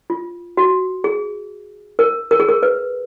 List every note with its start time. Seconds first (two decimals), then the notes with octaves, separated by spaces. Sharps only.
0.10 F4
0.57 F#4
1.04 G#4
1.99 A#4
2.31 A#4
2.40 G#4
2.49 A#4
2.63 B4